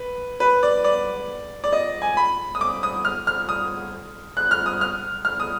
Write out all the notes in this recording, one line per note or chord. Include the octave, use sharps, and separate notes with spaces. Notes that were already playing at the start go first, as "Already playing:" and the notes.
Already playing: B4
B4
D5
D5
D5
D#5
G#5
B5
D#6
D6
D#6
F6
F6
D#6
F#6
F6
D#6
F6
F6
D#6